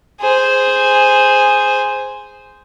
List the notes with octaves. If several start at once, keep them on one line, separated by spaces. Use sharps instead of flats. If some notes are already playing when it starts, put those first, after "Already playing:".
G#4 C5